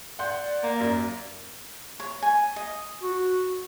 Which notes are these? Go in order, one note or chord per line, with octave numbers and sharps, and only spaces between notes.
D5 F#5 C6 G6
A#3
F#2
C#5
G#5
D#5
F#4